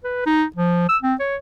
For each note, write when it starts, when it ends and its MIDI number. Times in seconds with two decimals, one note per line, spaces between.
0.04 0.21 71
0.26 0.44 63
0.56 0.88 53
0.89 0.97 88
1.02 1.14 60
1.19 1.36 73